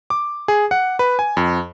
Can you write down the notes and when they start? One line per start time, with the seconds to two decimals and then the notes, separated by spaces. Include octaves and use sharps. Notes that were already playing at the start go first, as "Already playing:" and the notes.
0.10 D6
0.48 G#4
0.71 F#5
0.99 B4
1.19 G#5
1.37 F2